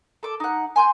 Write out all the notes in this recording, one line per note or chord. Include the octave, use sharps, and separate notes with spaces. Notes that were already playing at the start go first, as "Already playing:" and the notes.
A4 D6
D#4 F#5
G#5 C6 G6